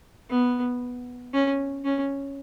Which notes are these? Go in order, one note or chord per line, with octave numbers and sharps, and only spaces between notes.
B3
C#4
C#4